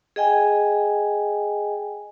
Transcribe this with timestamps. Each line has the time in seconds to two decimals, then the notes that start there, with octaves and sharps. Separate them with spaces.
0.16 G#4 D#5 G5 G#5